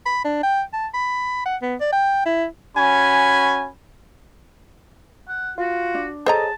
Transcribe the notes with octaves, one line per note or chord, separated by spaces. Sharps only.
B5
D4
G5
A5
B5
F#5
B3
D5
G5
E4
C#4 F#4 G#5 B5
F#5
F4 F#4
D4
G#4 A4 C5 C#5 D#5 A5 A#5